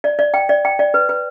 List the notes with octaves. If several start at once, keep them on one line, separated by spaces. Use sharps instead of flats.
D5
D5
G5
D5
G5
D5
B4
B4